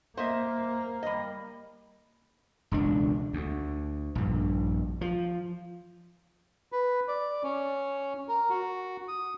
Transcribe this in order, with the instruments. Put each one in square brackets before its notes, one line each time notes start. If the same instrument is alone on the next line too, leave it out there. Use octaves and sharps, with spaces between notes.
[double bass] A#3 [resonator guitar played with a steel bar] C5 D#5 E5
[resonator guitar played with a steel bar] G3 D#5
[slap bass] E1 C#2 D4
D2
A#1 G2
F3
[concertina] B4
D5
C#4
A#4
F#4
D#6